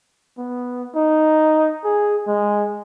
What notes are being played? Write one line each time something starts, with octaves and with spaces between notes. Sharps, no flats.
B3
D#4
G#4
G#3